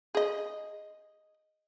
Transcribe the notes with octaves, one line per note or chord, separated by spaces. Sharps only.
G#4 D#5